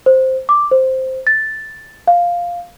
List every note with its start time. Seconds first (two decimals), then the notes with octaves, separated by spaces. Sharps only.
0.06 C5
0.49 D6
0.71 C5
1.27 A6
2.07 F5